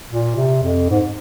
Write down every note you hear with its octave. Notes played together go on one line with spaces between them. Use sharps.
A#2
C3
F2
G#2